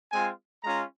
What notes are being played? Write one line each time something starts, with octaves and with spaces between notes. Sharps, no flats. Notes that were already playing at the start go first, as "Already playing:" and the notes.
G#3 C4 F4 G#5
G#3 C#4 F4 A#5